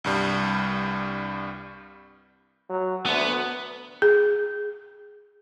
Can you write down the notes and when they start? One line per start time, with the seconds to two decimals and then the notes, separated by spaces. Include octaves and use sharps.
0.04 C2 G2 G3
2.70 F#3
3.06 D2 B3
4.02 G#4